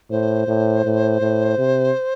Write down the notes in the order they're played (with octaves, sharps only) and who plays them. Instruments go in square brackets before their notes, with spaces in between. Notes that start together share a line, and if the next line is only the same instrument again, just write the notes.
[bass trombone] A2 [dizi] C5
[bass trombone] A2
A2
A2
C3